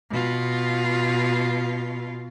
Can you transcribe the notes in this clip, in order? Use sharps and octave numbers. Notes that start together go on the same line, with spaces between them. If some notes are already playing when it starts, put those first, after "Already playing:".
B2 F4